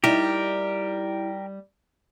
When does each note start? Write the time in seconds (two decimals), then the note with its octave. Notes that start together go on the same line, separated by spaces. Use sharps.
0.04 G3 D#4 E4 G4 A#4